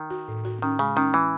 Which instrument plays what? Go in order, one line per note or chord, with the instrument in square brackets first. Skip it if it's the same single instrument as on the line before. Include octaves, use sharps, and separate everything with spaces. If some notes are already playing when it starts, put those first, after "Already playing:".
Already playing: [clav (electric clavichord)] D#3
[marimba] F#4
A2
F#4
[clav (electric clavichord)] D#3 [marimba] C#4
[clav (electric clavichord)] C#3 [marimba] G#3
[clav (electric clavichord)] D#3 [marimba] C#4
[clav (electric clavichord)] E3